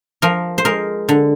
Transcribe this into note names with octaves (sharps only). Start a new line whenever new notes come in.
F3 A#4
C5
G#3 A#4
D3